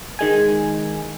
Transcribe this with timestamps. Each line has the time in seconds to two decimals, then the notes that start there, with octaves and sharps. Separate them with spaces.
0.19 D#3 G#3 G#5